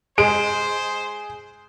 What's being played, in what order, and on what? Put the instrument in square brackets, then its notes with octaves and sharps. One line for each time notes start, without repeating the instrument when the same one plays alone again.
[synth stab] G#3 [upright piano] G#4 [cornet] C5 [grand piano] D7